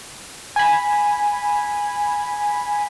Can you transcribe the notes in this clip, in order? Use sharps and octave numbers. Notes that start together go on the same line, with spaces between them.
G#5 B5